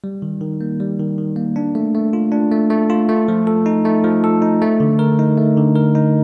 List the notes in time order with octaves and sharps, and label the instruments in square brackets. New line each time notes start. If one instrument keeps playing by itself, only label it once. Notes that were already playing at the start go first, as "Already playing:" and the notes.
[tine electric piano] G3
D#3
D#3
A#3
G3
D#3
D#3
A#3
D4
A3
A3
F4
D4
A3
A3
F4
A3
F3
A4
D#4
A3
F3
A4
D#4
A3
D3
A#4
D#4
A3
D3
A#4
D#4